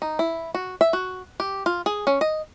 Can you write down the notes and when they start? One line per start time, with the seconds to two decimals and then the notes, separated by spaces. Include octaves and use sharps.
0.02 D#4
0.19 E4
0.54 F#4
0.81 E5
0.93 F#4
1.40 G4
1.66 F4
1.86 G#4
2.07 C#4
2.21 D#5